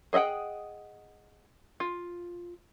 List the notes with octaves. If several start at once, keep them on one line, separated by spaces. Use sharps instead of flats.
G#4 D#5 E5 F#5 G5
F4